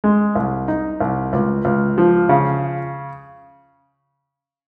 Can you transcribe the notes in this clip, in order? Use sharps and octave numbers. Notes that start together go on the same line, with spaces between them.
G#3
C2
D#4
C2
C#2
C#2
F3
C#3